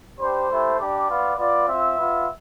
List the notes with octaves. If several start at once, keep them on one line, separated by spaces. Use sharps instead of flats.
G3 D4 G4 C5
A3 E4 G4
G3 D4 G4 D5
B3 F4
B3 F4 D5
C4 E5
F4
B3 F4